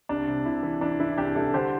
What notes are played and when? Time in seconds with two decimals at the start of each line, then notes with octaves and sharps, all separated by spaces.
0.09 C2 D4
0.27 C3
0.45 C3 E4
0.63 E3
0.81 E3 D4
1.00 E3 E4
1.17 C2 D4 G4
1.36 C2 E4 A4
1.53 D3 G4 C5